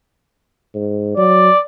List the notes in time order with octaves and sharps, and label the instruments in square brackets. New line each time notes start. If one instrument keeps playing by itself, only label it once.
[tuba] G#2
[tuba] F#3 [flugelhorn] D5